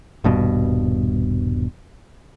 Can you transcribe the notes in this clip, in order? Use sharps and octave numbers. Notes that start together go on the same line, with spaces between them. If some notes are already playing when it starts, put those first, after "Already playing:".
D#1 G2 B2